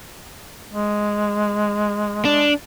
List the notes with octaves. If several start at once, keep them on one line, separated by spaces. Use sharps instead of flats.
G#3
D4